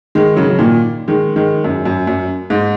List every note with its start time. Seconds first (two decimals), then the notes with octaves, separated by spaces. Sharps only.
0.15 D#3 G#3
0.36 C#3 F#3
0.49 C#3
0.58 A#2 D#3
1.08 D#3 G#3
1.36 D#3 G#3
1.64 F#2
1.85 F#2
2.07 F#2
2.50 G#2